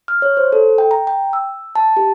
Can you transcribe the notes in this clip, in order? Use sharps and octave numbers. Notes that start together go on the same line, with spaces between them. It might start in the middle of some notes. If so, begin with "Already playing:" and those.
F6
C#5
C5
A4
G5
A#5
G5
E6
A5
G4